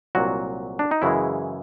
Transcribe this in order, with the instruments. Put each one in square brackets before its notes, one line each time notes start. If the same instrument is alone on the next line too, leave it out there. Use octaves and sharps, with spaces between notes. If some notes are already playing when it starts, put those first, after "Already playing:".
[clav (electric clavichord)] C2 A#2 F#3 F#4
D4
D#4
F#2 C#3 E3 G#3 E4